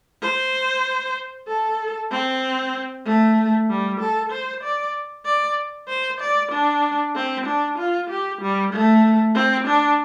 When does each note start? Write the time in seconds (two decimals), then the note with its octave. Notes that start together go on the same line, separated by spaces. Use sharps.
0.22 C5
1.48 A4
2.11 C4
3.05 A3
3.69 G3
4.00 A4
4.32 C5
4.63 D5
5.26 D5
5.88 C5
6.21 D5
6.51 D4
7.15 C4
7.46 D4
7.78 F4
8.10 G4
8.41 G3
8.73 A3
9.35 C4
9.67 D4